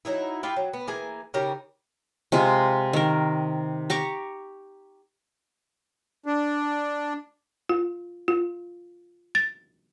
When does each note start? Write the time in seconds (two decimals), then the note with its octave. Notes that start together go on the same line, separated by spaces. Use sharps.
0.05 F#3 G3 D#4 E4
0.43 E4 F4 G4
0.56 F#3
0.73 B3
0.87 E3 A#3 G#4 G#5
1.34 C#3 D#4 G4 A#4
2.32 C3 G#3 F4
2.93 D#3 A#4
3.90 G4 A#5 C#6 D6
6.26 D4
7.69 F4
8.28 F4
9.35 A6